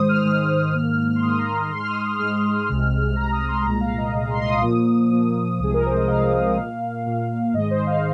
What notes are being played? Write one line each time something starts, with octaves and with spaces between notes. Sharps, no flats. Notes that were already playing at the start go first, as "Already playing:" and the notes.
Already playing: G#2 D#3 G#3 C5 D#6
F6
G#2 D#3 G#3 F6
G#2 D#3 A#3
C6
G#2 D#3 A#3 D#6
A#5
G#2 G#3 C6
F6
D#6
F6
G#2 G#3 F6
C2 C3 G#3
C2 C3 G#3 A#5
D#6
C6
C2 A#2 G#3 A#5
F5
D#5
C2 A#2 G#3
C6
C6
D#6
A#2 F3 A#3 D#6
A#2 F3 A#3
C2 C3 F3 G#3 G#4
A#4
C5
D#5
C2 C3 F3 G#3 F5
A#2 A#3
A#2 A#3
G#2 D#3 G#3 D#5
C5
F5